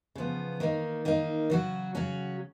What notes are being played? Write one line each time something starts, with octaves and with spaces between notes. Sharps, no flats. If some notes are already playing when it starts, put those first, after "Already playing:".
C#3 F3 B3
D#3 A#3 D#4
D#3 A#3 D#4
C#3 F#3 C#4 F#4
C#3 F#3 C#4 F#4